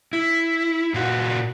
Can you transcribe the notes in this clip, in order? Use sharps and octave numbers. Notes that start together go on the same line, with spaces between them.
E4
A#2 F4 F#4